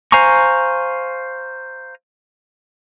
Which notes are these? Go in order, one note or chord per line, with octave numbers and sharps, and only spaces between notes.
C5 F5 G#5 A#5 C#6